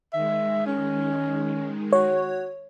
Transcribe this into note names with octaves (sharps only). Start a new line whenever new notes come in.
D#3 G#3 E5
C#4
F#4 C#5